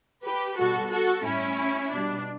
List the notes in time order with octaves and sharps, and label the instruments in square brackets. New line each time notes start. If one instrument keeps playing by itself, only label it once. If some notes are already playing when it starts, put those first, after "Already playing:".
[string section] G4 B4
B2 G3 F#4 A4
F#4 A4
A2 G3 C#4 E4
B2 G3 D4